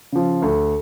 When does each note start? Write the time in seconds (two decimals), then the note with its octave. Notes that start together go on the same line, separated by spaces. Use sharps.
0.12 C#3 F3
0.42 D2